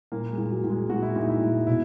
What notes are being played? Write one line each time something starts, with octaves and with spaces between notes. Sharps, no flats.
A#2 A#3
G#3
A#2
F#3
A#2
G#3
A#2 F#4
E4
A#2 D#4
E4
A#2
B2 E4